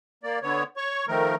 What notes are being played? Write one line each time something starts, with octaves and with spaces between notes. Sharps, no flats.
A#3 D5
D3 B3 C#5
C#5 C#6
D#3 F3 A3 A#4